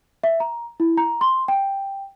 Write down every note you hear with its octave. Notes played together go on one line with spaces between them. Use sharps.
E5
A#5
E4
A#5
C6
G5